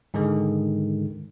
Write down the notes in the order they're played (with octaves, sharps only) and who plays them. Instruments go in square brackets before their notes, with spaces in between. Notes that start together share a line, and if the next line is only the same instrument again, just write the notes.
[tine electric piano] G#2 D3 D#3 G#3